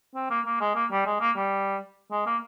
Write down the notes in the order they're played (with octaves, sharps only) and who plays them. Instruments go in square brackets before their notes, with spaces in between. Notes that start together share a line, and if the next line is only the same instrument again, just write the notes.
[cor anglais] C4
A#3
A#3
G#3
A#3
G3
G#3
A#3
G3
G#3
A#3